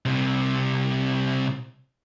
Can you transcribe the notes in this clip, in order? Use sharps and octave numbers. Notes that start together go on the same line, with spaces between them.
C2 C3